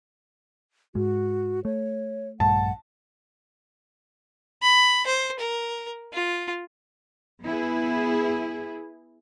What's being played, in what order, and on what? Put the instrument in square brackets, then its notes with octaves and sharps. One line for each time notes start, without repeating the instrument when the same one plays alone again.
[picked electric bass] G#2 G#3 [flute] F#4
[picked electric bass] A3 [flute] C#5
[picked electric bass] A#1 G2 A3 [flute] F#5 [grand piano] A5
[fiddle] B5
C5
A#4
F4
[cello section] B3 E4 G#4